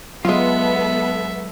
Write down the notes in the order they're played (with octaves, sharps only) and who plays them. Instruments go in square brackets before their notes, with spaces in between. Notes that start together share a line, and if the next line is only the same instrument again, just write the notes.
[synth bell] F#3 [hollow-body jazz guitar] G#3 F4 [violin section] B3 A4 [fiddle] E5